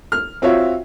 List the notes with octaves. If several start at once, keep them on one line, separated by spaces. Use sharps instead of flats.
F6
C4 F4 F#4 C#5 E5